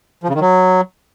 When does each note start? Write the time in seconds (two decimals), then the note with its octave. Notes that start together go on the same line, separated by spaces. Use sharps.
0.24 F3
0.29 C#3
0.35 D#3
0.41 F#3